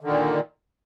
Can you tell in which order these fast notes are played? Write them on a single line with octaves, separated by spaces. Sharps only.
D3 D#3 A#2